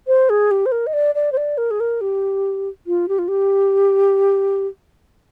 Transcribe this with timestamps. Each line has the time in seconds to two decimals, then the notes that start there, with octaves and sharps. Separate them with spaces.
0.07 C5
0.29 G#4
0.51 G4
0.66 C5
0.72 A#4
0.87 D#5
0.93 D5
1.15 D5
1.32 C5
1.37 D5
1.58 A#4
1.71 G#4
1.80 A#4
2.01 G4
2.87 F4
3.08 G4
3.18 F4
3.28 G4